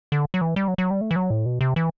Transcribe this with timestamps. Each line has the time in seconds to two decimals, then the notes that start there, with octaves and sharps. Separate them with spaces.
0.12 D3
0.34 F#3
0.41 E3
0.56 G3
0.68 F#3
0.78 F#3
0.91 G3
1.01 A3
1.11 E3
1.16 F#3
1.30 A2
1.46 B2
1.61 C3
1.76 E3